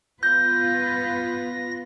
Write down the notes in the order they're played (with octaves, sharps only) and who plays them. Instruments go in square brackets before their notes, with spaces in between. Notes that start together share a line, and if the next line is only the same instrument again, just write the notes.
[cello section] B3 F4 B4 [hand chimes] G6 [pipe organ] A#6